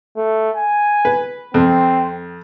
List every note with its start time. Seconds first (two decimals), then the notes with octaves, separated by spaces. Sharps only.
0.17 A3
0.56 G#5
1.05 B4
1.54 F2 C4